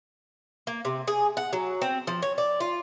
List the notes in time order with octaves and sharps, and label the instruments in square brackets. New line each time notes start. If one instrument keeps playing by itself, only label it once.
[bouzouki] A#3
C3
G#4
F#5
F#3
C4
F3
C#5
D5
F4